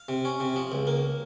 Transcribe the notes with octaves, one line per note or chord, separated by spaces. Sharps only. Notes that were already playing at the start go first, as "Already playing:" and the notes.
Already playing: F5
C3
C#4
C3
F3
C#2
A#3